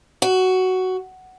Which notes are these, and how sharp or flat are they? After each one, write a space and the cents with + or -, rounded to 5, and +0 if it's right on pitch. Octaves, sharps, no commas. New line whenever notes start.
F#4 +10